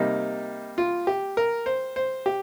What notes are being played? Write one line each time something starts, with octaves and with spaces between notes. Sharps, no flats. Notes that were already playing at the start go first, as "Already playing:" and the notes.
Already playing: C3 G3 A#3 D#4
F4
G4
A#4
C5
C5
G4